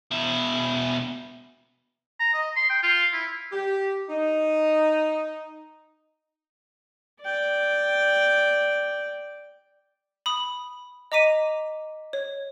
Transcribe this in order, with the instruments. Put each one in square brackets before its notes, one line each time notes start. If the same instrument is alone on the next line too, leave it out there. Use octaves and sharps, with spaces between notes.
[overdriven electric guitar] B2 E4
[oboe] A#5
D#5
C6
G5
F4
E4
[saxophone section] G4
D#4
[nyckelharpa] D5 G5
[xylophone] B5 D#6
D#5 A#5 D6 B6 D#7
C#5